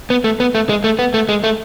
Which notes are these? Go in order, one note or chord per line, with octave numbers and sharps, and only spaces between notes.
B3
A3
B3
A3
G#3
A3
B3
A3
G#3
A3